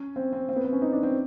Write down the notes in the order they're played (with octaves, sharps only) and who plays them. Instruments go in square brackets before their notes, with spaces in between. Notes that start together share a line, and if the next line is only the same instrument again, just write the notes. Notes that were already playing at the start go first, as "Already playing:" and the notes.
Already playing: [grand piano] C#4
C4
C4
C4
B3
C4
C#4
D#4
D4
C4